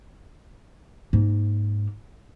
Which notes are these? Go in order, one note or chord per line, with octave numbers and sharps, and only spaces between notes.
G#2 A#3